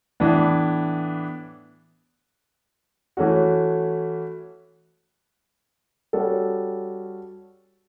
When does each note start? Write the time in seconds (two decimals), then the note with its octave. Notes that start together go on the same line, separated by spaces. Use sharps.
0.20 A2 E3 B3 D4
3.17 E3 A3 C#4 F#4
6.13 G3 C#4 F#4 A4